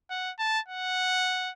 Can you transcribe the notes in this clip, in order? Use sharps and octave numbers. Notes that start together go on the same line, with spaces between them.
F#5
A5
F#5